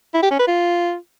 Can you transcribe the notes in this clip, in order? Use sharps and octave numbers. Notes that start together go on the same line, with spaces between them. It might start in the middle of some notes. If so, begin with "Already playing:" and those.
E4
G4
C#4
B4
F4